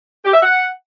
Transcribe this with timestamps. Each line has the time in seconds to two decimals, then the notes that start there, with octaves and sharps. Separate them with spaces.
0.25 G4
0.34 E5
0.43 F#5